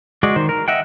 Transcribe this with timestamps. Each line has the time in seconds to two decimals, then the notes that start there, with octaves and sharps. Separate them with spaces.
0.23 G#3 F#4 G#4 D5
0.36 D#3 C5
0.49 A#4
0.68 D#5 E5 F#5 G5